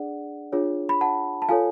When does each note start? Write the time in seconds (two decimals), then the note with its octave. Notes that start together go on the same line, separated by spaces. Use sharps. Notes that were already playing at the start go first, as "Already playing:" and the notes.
Already playing: D4 G#4 D5 F#5
0.52 D4 F4 G#4 C#5
0.89 B5
1.01 F#5 A5
1.42 A5
1.49 F4 A4 C#5 F5 G#5